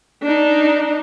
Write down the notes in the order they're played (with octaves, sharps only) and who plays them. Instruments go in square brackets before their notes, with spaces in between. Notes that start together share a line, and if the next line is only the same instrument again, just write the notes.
[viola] D4 D#4